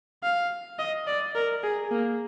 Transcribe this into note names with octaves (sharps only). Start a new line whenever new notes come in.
F5
D#5
D5
A#4
G#4
A#3